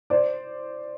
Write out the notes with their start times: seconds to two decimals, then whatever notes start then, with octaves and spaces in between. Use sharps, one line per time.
0.10 C5 D5